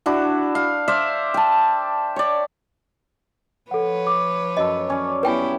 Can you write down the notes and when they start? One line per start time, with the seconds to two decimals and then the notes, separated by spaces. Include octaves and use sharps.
0.06 D4 E4 F#4
0.55 F5
0.88 C5 D5 E5 F5
1.34 G5 A5
2.16 C#5 D5
3.71 F3 A4 B4 C#5 F#5
4.07 D6
4.57 F#2 A4 D#5
4.88 F#3 C#4 D5
5.23 B3 E4 G4 B4 G5 G#5